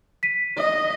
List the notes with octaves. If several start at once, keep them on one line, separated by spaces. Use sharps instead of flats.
B6 D#7
D#5